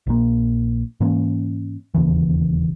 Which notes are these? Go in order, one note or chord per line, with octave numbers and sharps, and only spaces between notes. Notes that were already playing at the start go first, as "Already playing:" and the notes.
A#1 A#2 A#3
G#2 E3 A#3 C#4
E1 D#2 C#3 E3